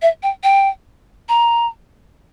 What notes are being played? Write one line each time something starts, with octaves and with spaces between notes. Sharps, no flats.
E5
G5
G5
A#5